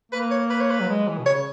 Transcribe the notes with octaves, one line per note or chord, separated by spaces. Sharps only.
A#3 B4
C#5
B4
C#5
B4
F#3
G#3
E3
B2
C#3 C#5